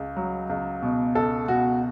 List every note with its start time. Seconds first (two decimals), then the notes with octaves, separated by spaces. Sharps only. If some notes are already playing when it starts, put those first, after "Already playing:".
Already playing: C#2
0.17 F#3
0.49 C#2
0.83 B2
1.15 C#2 A4
1.48 B2 F#4